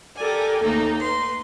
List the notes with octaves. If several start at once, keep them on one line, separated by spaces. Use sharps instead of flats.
G4 A4 A#4 D5 G#5
D#2 A3 A#3 D#4
B4 C6